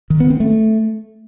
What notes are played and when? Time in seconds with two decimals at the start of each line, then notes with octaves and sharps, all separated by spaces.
0.10 D#3
0.20 B3
0.30 C4
0.40 A3